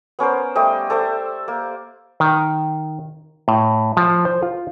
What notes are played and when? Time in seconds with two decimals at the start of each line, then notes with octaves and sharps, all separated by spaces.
0.19 B3 C#4 A#4 C5
0.55 G3 A3 G4 D#5
0.90 A4 C5 D5 E5
1.48 A#3
2.20 D#3
3.48 A2
3.97 F3
4.25 C5
4.43 F4